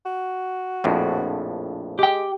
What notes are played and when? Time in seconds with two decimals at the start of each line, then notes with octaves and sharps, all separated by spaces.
0.06 F#4
0.84 A#1 F2 A2
1.99 G#3 G4 G5